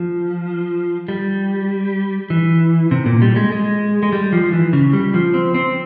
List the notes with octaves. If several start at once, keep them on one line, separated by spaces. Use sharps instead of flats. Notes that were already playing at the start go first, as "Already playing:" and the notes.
Already playing: F3
G3
E3
C3
A#2
G3
G#3
G#3
G#3
G3
F3
E3
C#3
G3
F3
C4
C4